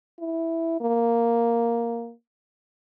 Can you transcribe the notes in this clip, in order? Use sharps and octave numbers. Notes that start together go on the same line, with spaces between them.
E4
A#3